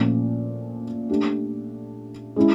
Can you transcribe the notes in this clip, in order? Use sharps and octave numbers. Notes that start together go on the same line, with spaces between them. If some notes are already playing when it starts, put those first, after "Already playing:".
Already playing: A#2 F3 A3 C#4
A3 D4 G4
G#3 C#4 E4